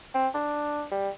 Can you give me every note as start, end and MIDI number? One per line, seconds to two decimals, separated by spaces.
0.14 0.28 60
0.35 0.84 62
0.92 1.09 55